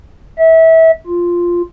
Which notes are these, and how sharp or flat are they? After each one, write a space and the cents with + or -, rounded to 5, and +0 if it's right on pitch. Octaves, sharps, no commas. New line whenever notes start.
E5 -25
F4 +0